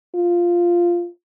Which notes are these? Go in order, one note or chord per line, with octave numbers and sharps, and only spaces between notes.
F4